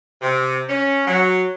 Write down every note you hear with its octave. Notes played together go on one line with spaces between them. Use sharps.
C3
C#4
F#3